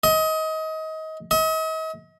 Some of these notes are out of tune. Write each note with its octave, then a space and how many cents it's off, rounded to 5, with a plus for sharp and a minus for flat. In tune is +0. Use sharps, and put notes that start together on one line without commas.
D#5 +25
D#5 +40